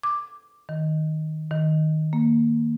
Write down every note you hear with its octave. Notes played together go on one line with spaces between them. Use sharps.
D6
D#3
D#3
A#3